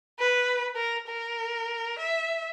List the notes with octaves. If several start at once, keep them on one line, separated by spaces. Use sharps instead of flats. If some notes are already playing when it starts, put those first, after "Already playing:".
B4
A#4
A#4
E5